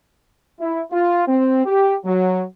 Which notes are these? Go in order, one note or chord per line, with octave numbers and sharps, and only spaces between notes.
E4
F4
C4
G4
F#3